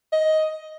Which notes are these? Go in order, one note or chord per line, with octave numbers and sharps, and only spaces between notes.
D#5